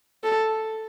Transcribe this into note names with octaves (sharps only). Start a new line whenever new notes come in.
A4